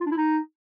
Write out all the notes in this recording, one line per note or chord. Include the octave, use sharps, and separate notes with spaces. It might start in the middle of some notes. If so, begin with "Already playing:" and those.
F4
D4
E4
D#4